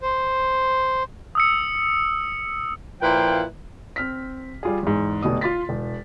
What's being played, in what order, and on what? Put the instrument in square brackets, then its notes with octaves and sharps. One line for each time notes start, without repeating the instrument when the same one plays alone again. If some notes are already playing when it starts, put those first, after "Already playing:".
[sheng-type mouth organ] C5
[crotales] D#6 E6 C#7
[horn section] A#2 F3 E4 B4 F5 G5
[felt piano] C4 F6 B6
G3 F4 G#4
E2 G#2
F1 B2 D#6
F4 C6 A6 B6
E1